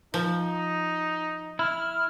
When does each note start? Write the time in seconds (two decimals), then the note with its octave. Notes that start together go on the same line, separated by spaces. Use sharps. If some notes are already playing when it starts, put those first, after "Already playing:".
0.14 F3 D#4
1.59 E4 F6